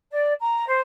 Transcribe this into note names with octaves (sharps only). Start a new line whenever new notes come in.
D5
A#5
C5